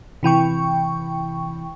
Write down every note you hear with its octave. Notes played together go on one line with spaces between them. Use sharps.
C3 E3 G5 C#6